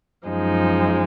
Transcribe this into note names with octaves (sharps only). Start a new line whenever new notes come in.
F#2 F3 G#3 D#4